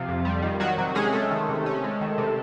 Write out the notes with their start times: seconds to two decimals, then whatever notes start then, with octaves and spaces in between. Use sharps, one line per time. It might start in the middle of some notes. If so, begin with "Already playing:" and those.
Already playing: C3 F3 F4
0.08 F2
0.25 G3
0.42 D#3
0.60 D#3 F#3 F#4
0.78 C3 F#3 F#4
0.95 G#3 C#4 G#4
1.12 G#3 A3 A4
1.30 D#3
1.49 C3
1.66 C#4
1.84 G#3
2.01 D#3
2.18 C3